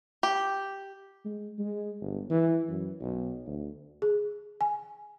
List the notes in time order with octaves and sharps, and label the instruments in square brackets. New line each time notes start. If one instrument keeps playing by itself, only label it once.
[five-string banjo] G4
[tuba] G#3
G#3
G1
E3
F#2
B1
D2
[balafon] G#4
G#5